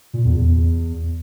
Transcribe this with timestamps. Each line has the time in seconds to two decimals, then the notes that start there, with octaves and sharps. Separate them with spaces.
0.14 A#2
0.25 E2
0.37 E2